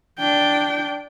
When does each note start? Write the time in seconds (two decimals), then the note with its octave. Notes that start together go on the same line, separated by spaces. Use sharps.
0.19 D4 G5